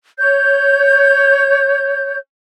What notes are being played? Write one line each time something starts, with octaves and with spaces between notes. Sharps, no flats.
C#5 G6